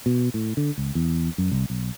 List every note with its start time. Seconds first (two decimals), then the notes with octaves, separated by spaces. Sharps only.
0.06 B2
0.34 A2
0.57 D3
0.78 C#2
0.95 E2
1.38 F#2
1.52 C2
1.70 B1